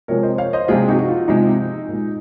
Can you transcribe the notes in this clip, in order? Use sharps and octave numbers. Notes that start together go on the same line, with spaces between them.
C3 F3 G#3 A#4 C#5
C5 D#5
C#5 F5
C5 D#5
C3 F3 G#3 F4 G#4
D#4 F#4
F#4
F4
C3 F3 G#3 D#4
A#2
G#3